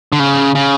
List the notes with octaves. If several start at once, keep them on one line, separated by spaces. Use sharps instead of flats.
D3
C#3
C#3